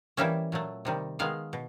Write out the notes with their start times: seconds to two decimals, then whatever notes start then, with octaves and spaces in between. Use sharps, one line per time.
0.17 E3 G3 A#3 C#4 E5
0.52 A#2 F#3 A3
0.85 C3 D#3 G3
1.19 D#3 G#3 B3 F5
1.53 B2